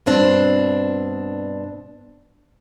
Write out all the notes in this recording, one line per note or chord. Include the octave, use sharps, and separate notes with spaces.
G2 B2 C4 D4